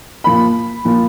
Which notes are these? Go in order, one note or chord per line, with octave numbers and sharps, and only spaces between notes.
A#2 F3 A#3 B5
A#2 F3 A#3